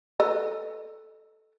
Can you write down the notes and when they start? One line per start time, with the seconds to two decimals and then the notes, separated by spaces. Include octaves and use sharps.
0.20 A4 B4 D#5